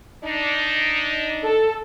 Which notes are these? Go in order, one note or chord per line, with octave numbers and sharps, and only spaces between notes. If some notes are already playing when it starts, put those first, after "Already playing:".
D4 D#4
A4